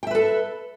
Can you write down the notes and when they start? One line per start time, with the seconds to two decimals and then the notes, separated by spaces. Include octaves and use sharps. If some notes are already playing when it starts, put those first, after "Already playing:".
0.03 G5
0.07 E5
0.11 B4
0.15 A4